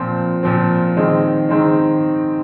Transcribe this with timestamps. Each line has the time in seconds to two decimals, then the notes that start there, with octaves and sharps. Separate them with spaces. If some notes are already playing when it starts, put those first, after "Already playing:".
Already playing: A#2 F3 C4
0.43 A#2 F3 C4
0.97 D#3 G#3 C4 D#4
1.49 D#3 G#3 C4 D#4